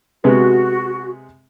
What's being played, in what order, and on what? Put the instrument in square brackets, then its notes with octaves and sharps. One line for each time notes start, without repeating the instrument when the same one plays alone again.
[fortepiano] C3 G#3 B3 [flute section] F#4